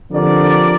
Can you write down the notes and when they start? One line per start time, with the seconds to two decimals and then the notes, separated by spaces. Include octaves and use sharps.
0.11 D3 F3 C4 G4 A#4 D5